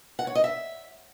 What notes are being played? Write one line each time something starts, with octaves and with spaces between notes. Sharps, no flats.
F#5
C#5
D#5
E5